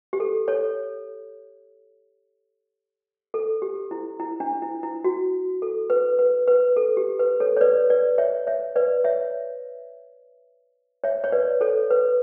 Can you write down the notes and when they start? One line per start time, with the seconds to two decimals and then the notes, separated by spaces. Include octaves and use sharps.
0.13 G4
0.20 A4
0.48 A4 C#5
3.34 A4
3.62 G4
3.91 E4
4.20 E4
4.40 D4
4.62 E4
4.83 E4
5.04 F#4
5.62 A4
5.90 B4
6.19 B4
6.48 B4
6.77 A4
6.97 G4
7.19 B4
7.40 A4 C#5
7.57 C#5
7.61 B4 D5
7.90 B4 D5
8.18 C#5 E5
8.47 C#5 E5
8.76 B4 D5
9.04 C#5 E5
11.04 C#5 E5
11.24 C#5
11.32 B4 D5
11.61 A4 C#5
11.90 B4